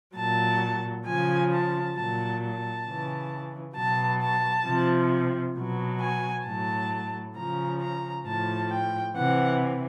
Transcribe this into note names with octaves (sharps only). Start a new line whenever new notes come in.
A#2 F#3 A5
C#3 F3 G#5
A5
A#2 F#3 A5
A5
C#3 E3
B2 F#3 A5
A5
C3 F3
B2 F#3
G#5
A2 F#3 A5
C#3 F3 A#5
A#5
A2 F3 A5
G5
C3 E3 F#5